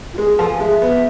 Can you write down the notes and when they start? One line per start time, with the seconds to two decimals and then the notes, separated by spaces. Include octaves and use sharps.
0.13 F4
0.18 G#3 G#4
0.28 G#4
0.38 F3 A4
0.50 G#5
0.60 G#3 E5
0.82 B3